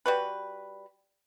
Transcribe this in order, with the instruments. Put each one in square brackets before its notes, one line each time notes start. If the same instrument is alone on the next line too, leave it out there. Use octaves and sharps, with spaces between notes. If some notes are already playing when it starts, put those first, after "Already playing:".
[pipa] G3 F#4 B4